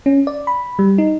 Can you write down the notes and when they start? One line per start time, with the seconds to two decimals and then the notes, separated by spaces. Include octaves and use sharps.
0.06 C#4
0.27 D5
0.47 B5
0.79 G3
0.98 D#4